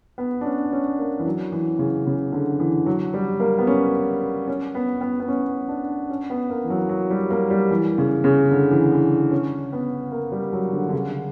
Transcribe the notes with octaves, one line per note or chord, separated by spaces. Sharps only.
B3
D4
C#4
C#4
A#3
E3
F#3
E3
C#3
C#3
D3
E3
F#3
G3
A#3
B3
C#4
C#4
B3
B3
B3
C#4
D4
C#4
B3
A#3
E3
F#3
F#3
G3
A#3
G3
E3
C#3
C#3
D3
E3
E3
C#4
B3
A#3
G3
F#3
D3
D3
C#3